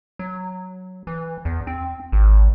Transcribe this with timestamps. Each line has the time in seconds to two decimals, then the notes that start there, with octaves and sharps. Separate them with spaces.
0.19 F#3
1.07 E3
1.45 E2
1.67 C4
2.12 G#1